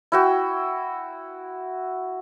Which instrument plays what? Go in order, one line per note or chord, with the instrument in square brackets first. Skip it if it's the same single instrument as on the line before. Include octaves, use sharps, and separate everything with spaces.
[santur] E4 F#4 G5